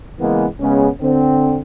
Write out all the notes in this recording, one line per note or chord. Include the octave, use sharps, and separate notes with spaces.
C#3 E3 G#3 A#3 B3
C#3 G#3 B3 C#4
D3 C4